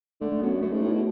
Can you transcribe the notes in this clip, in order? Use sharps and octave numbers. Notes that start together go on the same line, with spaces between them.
D3 A3
A3
F#2 B3
F#2 A3
G#2
A2
B2